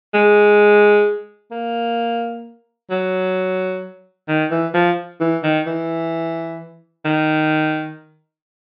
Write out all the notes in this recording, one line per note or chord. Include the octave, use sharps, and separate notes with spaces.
G#3
A#3
F#3
D#3
E3
F3
E3
D#3
E3
D#3